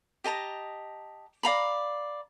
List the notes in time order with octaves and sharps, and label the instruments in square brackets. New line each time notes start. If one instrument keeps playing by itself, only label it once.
[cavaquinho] G4 D#5 A5 A#5
D5 F5 A#5 B5